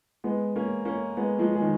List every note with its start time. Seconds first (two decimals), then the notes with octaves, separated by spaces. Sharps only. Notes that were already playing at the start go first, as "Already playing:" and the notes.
0.24 G#3 B3
0.56 A#3 C#4
0.85 A#3 C#4
1.17 G#3 B3
1.39 F3 G#3
1.55 G#3
1.62 D#3